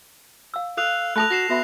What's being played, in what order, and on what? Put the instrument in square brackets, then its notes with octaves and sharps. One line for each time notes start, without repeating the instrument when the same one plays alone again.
[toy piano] F5 E6
[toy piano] A4 [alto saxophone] F5 [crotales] E6 F#6 F7
[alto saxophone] A3 [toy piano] A4 A5 B5 [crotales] F#6 A#6 F7
[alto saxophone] F#4 [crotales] A#6 C7 E7
[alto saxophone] B3 [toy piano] F#4 E5 B5